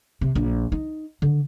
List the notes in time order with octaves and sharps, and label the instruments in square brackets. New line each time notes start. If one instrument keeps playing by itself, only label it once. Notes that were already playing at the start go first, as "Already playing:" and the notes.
[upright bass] C3
A#1
D#4
D3